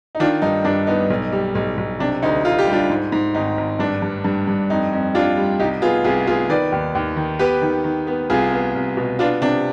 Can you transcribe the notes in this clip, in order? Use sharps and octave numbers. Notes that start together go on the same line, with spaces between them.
D#4
D#3 D4 F4
G2 D#4
G2 D4
B3 D#4
B1
G3
B1
B1
C3 D4
D2 D#4
D2 F4
G4
G3 D4 F4
G#2
G#2
G#1 D#4
G#1
G2 D4
G2
G2
G2
F2 D#4
F2
G3 D4 F4
G3
C2 D#4 G4
B3 F4 G#4
C2 F4 G#4
B3 F4 G#4
D#3 B4 D5
D#2
D#2
D#3
B3 G4 B4
D#3
D#3
B3
C2 F4 G#4
B3
C2
B2
B3 D4 F4
C3 D4